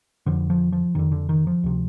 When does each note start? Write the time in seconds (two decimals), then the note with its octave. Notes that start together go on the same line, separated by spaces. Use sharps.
0.26 F2 D3 F3
0.50 F3
0.72 F3
0.95 F2 D3 D#3
1.12 D3
1.29 D#3
1.47 F3
1.64 D2 C3